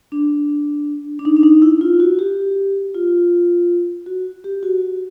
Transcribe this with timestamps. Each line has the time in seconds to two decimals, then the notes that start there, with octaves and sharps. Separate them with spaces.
0.12 D4
1.19 D4
1.25 D#4
1.37 D4
1.43 D#4
1.62 E4
1.81 F4
2.00 F#4
2.19 G4
2.94 F4
4.06 F#4
4.44 G4
4.63 F#4
4.81 F#4